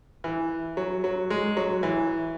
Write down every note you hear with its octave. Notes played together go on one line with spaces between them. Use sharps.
E3
F#3
F#3
G#3
F#3
E3